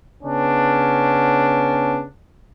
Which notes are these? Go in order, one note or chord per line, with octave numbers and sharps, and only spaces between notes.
C#3 B3 C#4 D4